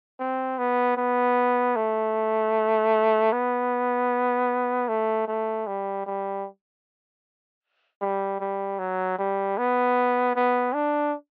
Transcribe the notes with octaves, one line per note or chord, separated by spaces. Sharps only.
C4
B3
B3
A3
B3
A3
A3
G3
G3
G3
G3
F#3
G3
B3
B3
D4